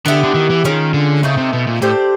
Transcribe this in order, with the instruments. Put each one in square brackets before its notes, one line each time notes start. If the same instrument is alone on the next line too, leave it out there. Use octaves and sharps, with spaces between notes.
[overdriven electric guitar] D3 [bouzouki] B3 E4 G4
[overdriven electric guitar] D3
D#3
E3
[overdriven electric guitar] D#3 [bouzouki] G#3 C#4 F4
[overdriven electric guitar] D3
[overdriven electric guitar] C#3 [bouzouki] A3 C4 D#4
[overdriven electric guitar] C3
B2
A#2
[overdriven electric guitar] A2 [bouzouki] A3 D4 G4 C5